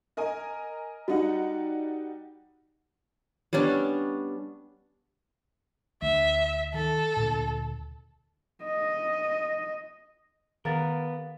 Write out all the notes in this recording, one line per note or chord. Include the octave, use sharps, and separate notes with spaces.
A#4 D#5 G#5
G3 D#4 F#4 F#5
G3 B3 C#4 D4
D2 E5
D#3 A4
D2 A#2
D#5
D#3 B3 A#4 F5 A6